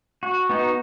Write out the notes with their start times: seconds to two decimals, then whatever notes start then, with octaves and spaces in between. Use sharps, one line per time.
0.23 F#4
0.49 B3 D#4 F#4